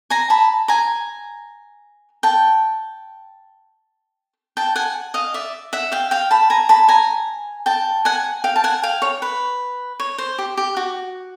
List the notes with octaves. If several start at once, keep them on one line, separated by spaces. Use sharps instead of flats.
G#5 A#5
A5 B5
G#5 A#5
G5 A5
G5 A5
F#5 G#5
D#5 F5
D5 E5
E5 F#5
F5 G5
F5 G5
A5 B5
G#5 A#5
A5 B5
G#5 A#5
G5 A5
F#5 G#5
F5 G5
A5
F#5 G#5
F5 G5
C#5
B4
C#5
C5
G4
G4
F#4